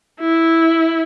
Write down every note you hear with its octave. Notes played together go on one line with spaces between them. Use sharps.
E4